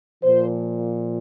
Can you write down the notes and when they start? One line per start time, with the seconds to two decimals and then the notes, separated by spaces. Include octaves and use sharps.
0.23 A#2 F3 C5